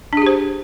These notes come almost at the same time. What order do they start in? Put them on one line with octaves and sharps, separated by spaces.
D4 G#4 G4 C5